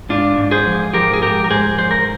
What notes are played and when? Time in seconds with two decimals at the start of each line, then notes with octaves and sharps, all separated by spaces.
0.09 G#2 D4 F4
0.38 G#2
0.51 G#4 C5
0.66 F3
0.94 F3 G4 A#4
1.13 G#4
1.22 G#2 G4 A#4
1.44 A#4
1.50 G#2 G#4 C5
1.78 F3 C5
1.91 A#4